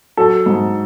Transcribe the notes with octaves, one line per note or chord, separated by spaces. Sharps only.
F#3 A4
G#2